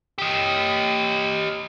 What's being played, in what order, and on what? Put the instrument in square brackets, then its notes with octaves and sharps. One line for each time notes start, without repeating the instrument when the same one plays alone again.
[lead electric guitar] G4 D#5